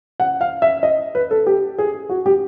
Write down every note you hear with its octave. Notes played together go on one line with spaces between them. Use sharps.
F#5
F5
E5
D#5
B4
A4
G4
G#4
F#4
G4